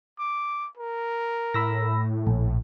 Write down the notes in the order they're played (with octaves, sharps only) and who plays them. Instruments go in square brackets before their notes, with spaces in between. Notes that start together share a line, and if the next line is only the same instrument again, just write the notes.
[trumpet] D6
A#4
[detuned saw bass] A2 [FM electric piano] B5 E6 A#6
[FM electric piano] A#1